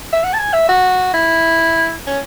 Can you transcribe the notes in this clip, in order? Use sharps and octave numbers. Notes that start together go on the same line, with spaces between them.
E5
F#5
A5
G#5
E5
F#4
E4
C#4